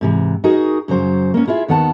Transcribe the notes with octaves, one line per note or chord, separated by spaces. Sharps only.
G#2 C3 E3
D#4 F#4 G#4 A#4 D#5
F#2 C#3 F#3 C5
A#3 B3 C#4
E4 F4 G#4 E5
D#2 D#3 B3 F#5 G#5 A5